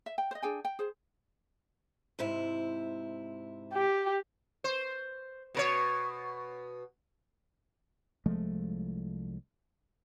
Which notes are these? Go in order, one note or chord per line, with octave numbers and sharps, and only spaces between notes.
E5
G5
C5 D#5
D4 G#4 G5 G#5
G5
G#4 C5
G#2 C3 E4
G4
C5
B2 A#4 C#5
C2 F3 G#3 A3